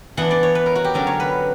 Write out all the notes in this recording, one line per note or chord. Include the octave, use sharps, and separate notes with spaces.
E3 B3 D4 F#5
D5
C#5
B4
A#4
F#4
G4
D3 F#3 C#4 A#4
C#5
B4